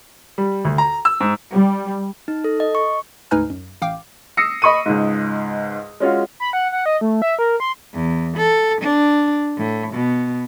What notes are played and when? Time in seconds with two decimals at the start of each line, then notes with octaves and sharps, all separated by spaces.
0.38 G3
0.65 D2
0.78 A#5
1.05 E6
1.20 G#2
1.53 G3
2.28 D#4
2.44 A4
2.60 D#5
2.75 C#6
3.31 D2 G#2 D#4 B4 G#5 F6
3.50 F#2
3.82 A1 F5 G5 D6
4.37 D#6 E6 A#6 C7 C#7
4.62 D#5 B5 C#6 D#6 D#7
4.86 C#2 G#2
6.00 G#3 C#4 F4 F#4
6.40 B5
6.53 F#5
6.72 F#5
6.86 D#5
7.01 A3
7.22 E5
7.39 A#4
7.60 C6
7.94 E2
8.37 A4
8.82 D4
9.58 A2
9.94 B2